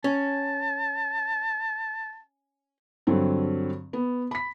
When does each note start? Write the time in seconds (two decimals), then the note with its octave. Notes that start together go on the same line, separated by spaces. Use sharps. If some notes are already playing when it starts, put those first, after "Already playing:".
0.04 C#4 A5
3.07 G2 D3 F#3 C4
3.93 B3
4.31 B5 B6